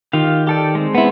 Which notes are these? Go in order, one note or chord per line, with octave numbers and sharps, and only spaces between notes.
D#3 F4 G4 F5
G4 A4 D5
G#3 C4
B3 E4